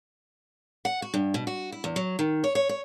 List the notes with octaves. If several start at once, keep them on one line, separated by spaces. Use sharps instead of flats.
F#5
F#4
G2
B2
F#4
E4
E2
F#3
D#3
C#5
C#5
C#5